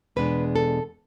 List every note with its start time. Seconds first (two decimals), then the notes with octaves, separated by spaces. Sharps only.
0.16 E2 B2 G#3 B3 D4 B4
0.56 A4